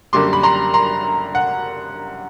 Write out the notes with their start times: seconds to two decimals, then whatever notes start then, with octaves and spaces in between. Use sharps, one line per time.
0.13 F#2 D3 G3 A#3 C6 D6
0.33 B5
0.43 A#5 C6
0.74 A#5 C6
1.35 F#5